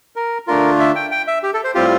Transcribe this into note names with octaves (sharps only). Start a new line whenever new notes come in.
A#4
D3 A3 D4 F4 A#4
E5
G5
G5
E5
G4
A4
C5
A2 G3 C4 F4 G4